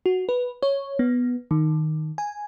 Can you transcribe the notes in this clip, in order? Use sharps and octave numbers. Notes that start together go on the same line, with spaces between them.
F#4
B4
C#5
B3
D#3
G#5